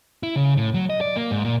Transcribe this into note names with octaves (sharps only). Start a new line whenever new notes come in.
E4
C#3
A2
F#3
D#5
D5
A#3
G#2
A#2